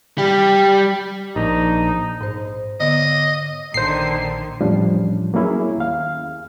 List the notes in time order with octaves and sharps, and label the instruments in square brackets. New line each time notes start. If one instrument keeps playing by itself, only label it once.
[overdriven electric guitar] G3 G4
[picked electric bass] A#1 [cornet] D#4
[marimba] G#2 C5
[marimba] D3 B3 [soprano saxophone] D#5
[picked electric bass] A#1 A#2 [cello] D3 D#3 [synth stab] C5 C7
[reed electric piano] E2 A2 F3 G3 C#4 D4
F#3 A#3 B3 C#4 E4 G#4
D#2 F5